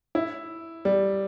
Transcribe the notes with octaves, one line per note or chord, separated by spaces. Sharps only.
E4
G3